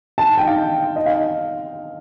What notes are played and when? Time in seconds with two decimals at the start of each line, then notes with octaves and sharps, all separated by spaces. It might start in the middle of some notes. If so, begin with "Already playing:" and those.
0.18 A5
0.38 G5
0.47 F5
0.96 D#5
1.06 F5